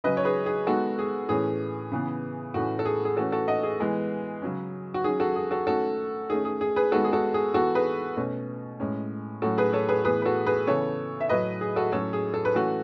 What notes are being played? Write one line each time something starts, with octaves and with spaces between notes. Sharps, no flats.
C#3 F#3 C#4 B4 D#5
C#5
G#4 B4
G#4
D#3 G#3 B3 F#4 A4
G#4
A2 E3 A3 C#4 G#4
C#3 E3 B3
A2 E3 A3 C#4 F#4
A4
G#4
G#4
E3 A3 C#4 F#4 A4
F#4 A4
D#5 F#5
G#4
E3 G#3 B3
C#3 F#3 C#4
F#4
D#3 F#3 C#4 G#4
F#4 A4
G#4
F#4 A4
D#3 A3 C#4 F#4 A4
D#3 A3 C#4 G#4
G#4
G#4
G#4 B4
D#3 G#3 B3 F#4 A4
G#4
F#4 A4
G#4
E3 B3 F#4 A4
G#4 B4
B2 A3 C#4
A2 G#3 C#4
A2 F#3 A3 C#4 F#4 A4
G#4 B4
A4 C#5
G#4 B4
A2 E3 B3 G#4 B4
B4
F#4 A4
G#4 B4
C#3 E3 B3 A4 C#5
E5
A2 F#3 A3 B4 D#5
G#4
F#4 A4
A2 F#3 A3 C#4 A4 C#5
G#4
A4
B4
E3 A3 C#4 F#4 A4